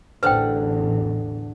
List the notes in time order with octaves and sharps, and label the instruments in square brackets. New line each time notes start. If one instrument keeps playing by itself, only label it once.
[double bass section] A1 E2 [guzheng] D3 D4 A5 [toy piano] B4 C5 G5